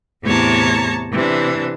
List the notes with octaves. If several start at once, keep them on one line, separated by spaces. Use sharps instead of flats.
E2 A2 C3 C#5 A5 A#5
C3 E3 D4